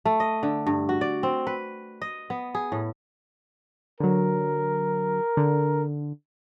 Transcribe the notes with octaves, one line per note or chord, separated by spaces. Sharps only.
A3
D#5
D3
G2
F#4
D5
C4
B4
D#5
B3
G#4
A2
D3 F#3 A#4
D3